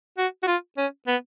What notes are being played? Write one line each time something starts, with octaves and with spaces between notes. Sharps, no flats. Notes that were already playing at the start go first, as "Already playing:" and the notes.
F#4
F#4
F4
C#4
B3